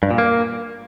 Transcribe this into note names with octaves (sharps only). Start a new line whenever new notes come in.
G2
A#2
A#3